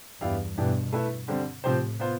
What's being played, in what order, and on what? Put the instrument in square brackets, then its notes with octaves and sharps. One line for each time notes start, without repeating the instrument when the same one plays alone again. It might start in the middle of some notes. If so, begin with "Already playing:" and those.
[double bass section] E2 G2 [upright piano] B3 E4 G4 D5 F5
[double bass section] G2 B2 [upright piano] E3 B3 D4 G4
[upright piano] A3 E4 B4 E5
D3 G3 C4
[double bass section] A2 C3 [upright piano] F3 C4 G4 C5
[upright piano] B3 F4 C5